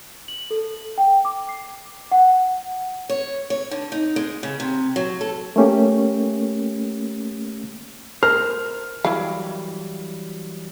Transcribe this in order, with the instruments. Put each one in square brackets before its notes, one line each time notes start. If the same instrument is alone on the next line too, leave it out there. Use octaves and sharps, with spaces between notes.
[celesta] F#7
A4
G5
D6
C7
F#5
[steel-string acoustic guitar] C#5
C#5
D3
D#4
G#3
C#3
C3
F#3
A4
[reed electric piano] A3 A#3 C#4 G4
[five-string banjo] A#4 [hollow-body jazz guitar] C5 [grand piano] F6
[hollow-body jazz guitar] E3 F#3 G3 [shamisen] E4 F5